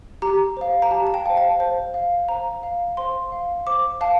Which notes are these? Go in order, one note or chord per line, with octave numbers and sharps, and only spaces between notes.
G4 A#5
C5 F5
A#5
G4 A5
A5
G5
C5 F5
A5
C5
F5
C5 A#5
F5
C5 C6
F5
C5 D6
F5 A5